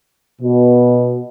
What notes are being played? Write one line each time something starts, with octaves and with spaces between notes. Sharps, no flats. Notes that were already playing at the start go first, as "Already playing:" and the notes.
B2